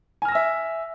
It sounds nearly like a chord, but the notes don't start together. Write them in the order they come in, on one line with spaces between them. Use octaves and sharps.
G#5 F6 A#6 E6 E5